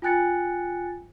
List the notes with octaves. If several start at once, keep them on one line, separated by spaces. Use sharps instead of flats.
F4 G5 G#5 F#6 A6 C#7